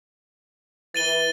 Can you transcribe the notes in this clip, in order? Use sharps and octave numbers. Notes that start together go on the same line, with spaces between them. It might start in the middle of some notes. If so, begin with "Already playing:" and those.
E3 A6 D#7 G7